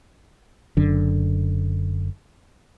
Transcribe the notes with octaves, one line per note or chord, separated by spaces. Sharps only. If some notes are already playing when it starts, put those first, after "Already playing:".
F#1 F#2 D3